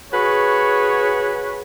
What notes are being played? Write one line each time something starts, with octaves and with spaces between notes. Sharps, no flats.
F#4 G#4 B4 C#5